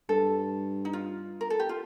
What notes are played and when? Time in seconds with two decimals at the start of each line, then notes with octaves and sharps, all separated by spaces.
0.09 G2 A4
0.85 D#4
0.93 F4
1.41 A#4
1.50 A4
1.60 G4
1.69 F4